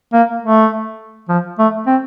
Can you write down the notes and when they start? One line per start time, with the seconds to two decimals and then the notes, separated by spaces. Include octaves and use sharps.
0.13 A#3
0.43 A3
1.29 F3
1.58 A3
1.87 C4